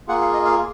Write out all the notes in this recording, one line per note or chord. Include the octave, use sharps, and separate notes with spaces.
A#3 F4 G#4 F#5
F5
D#5
F5